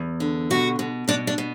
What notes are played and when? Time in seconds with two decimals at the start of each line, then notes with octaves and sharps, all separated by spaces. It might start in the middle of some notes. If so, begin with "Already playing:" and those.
Already playing: E2
0.20 D3
0.50 B2 F#4
0.79 B2
1.08 B2 D4
1.27 D4
1.38 B2